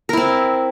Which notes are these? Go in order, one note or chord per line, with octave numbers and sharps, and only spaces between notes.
C4 E4 A#4